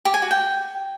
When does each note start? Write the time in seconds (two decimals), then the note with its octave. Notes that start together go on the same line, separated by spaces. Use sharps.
0.05 G4
0.14 G#5
0.22 F#4
0.31 G5